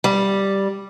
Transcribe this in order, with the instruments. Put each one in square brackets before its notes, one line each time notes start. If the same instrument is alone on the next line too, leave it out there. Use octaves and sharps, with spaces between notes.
[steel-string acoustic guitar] G3